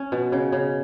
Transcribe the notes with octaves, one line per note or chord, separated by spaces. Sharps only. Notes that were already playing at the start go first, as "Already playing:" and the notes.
Already playing: C#4
B2
C#3
C#3